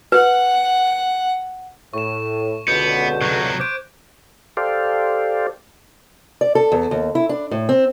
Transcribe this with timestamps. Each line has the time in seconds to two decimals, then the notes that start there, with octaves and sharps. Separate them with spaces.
0.12 B4 F#5
1.93 A2 C#6 E7
2.68 C#2 B2 D3 B3 G6
3.22 C3 F#3 C#6 F#6 G#6
3.60 C5 D6 G6 D7
4.57 G4 A4 C5 D5 F5
6.41 D5
6.55 A4
6.72 E2
6.91 D#2
7.15 E4
7.29 D4
7.51 A2
7.69 C4